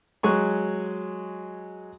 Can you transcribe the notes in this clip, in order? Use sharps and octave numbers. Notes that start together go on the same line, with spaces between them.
F#3 G#3 G#5 C#6